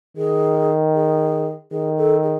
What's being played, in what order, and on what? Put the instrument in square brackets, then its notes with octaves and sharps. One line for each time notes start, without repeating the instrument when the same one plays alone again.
[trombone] D#3 [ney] G#4
[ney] G#4
[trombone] D#3 [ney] G#4
[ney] A4
G#4